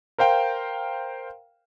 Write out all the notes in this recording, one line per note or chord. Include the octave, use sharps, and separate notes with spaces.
A#4 C5 F5 G5